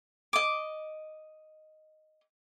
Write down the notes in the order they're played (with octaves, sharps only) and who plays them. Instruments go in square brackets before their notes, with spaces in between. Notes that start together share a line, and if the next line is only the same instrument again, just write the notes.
[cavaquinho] D#5 D6